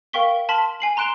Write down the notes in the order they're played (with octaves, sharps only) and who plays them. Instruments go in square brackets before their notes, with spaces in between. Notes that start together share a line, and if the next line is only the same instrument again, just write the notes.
[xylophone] A#4 F5 G5 C#6 B6 G7
A5 C6 F6 B6 F#7
G#5 C7 F#7
A#5 C6 F#6 D7 E7 G7